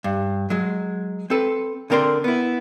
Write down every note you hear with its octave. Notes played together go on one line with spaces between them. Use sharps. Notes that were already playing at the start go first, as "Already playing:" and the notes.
G2
F#3 G#3
C4 A4 B4
D3 C4 A#4 D5 C6
B3 E4